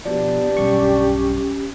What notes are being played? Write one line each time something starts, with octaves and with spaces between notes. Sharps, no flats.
B2 F3 B3 D4 G4
B1 G2 C#4 C#6